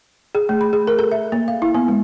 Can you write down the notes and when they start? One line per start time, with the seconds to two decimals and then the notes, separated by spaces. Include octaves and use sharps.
0.35 G#4
0.49 A3
0.61 B5
0.73 G#4
0.87 A#4
0.99 A4
1.12 E5
1.32 A#3
1.48 F5
1.62 E4
1.75 B3
1.88 G#3